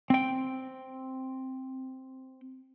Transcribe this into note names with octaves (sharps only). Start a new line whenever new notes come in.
C4 G5